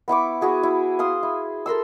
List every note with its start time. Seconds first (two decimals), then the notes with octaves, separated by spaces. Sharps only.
0.08 B3 E4 C#6 D6
0.41 E4 F#4 G#4 F#5
0.63 E4
0.99 F5 C6 D#6
1.23 E4
1.66 A4 A#4 C6 E6